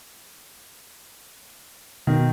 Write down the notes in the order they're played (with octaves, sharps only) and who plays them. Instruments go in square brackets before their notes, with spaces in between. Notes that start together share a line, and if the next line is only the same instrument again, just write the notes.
[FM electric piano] B2 [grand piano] D#3